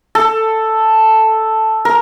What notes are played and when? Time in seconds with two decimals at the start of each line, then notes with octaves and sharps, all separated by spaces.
0.15 A4
1.85 A#4